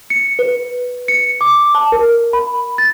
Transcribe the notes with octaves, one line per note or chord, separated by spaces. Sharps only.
C#7
B4
C#7
D6
A5
A#4
B5
A6